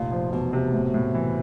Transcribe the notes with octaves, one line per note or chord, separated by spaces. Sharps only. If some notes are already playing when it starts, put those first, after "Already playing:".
Already playing: F1 A#2
F3
E2 B2
C3
A2
A2
E3